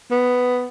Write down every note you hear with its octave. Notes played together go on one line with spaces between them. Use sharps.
B3